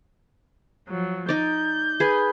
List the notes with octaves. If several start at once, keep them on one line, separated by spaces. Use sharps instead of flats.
F3 F#3
D#4 D5 G6
G#4 B4